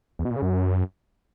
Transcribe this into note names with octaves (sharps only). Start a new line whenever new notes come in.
E2
B2
A#2
C#3
F#2